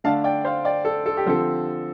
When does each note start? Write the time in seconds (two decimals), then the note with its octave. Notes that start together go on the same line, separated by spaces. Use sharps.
0.04 D3 A3 D4 F5 A5
0.24 D5 G5
0.45 C5 F5
0.65 D5 G5
0.85 A4
1.06 A4
1.17 G4
1.26 D3 F3 C4 A4